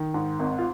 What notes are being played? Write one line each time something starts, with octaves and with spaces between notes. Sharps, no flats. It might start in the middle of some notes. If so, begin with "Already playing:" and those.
Already playing: D#3
G#2
G#1
F4